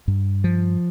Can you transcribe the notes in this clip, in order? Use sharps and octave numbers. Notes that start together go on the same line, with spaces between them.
G2
F3